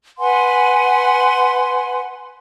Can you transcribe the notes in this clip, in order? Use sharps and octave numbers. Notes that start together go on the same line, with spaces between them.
B4 F#5 G#5 C6